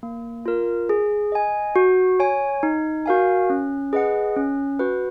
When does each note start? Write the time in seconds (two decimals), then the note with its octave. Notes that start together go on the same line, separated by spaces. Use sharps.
0.03 A#3
0.46 F4 A#4
0.89 G#4
1.32 D#5 G#5
1.76 F#4
2.20 C#5 G#5
2.63 D#4
3.06 F#4 A#4 F5 G#5
3.50 C#4
3.93 G#4 B4 D#5 F#5
4.36 C#4
4.79 F#4 B4